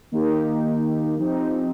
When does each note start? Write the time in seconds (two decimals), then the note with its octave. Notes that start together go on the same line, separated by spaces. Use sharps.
0.12 D#3 A#3 D#4 G4
1.19 F3 C4 D#4 G4